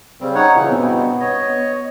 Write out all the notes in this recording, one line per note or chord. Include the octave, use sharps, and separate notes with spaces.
C#3 G3 C4
D#4 C#5 F#5
A#2 C#3 E3 E4
G2 B2 B3 C4
C#5 D#5